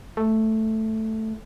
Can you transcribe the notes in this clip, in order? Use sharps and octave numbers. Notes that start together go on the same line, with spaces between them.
A3